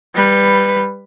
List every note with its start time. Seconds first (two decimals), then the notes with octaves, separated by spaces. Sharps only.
0.15 G3 B4